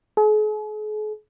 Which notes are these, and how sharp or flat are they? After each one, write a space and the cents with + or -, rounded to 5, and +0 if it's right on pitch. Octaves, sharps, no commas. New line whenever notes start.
G#4 +45